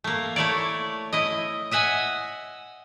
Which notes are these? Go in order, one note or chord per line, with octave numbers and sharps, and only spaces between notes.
A3 A#3
A3 E4 C#5 D5
E4 D#5
D#5 E5 F#5 G#5